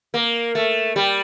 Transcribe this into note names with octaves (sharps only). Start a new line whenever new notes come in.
A#3
A3
G3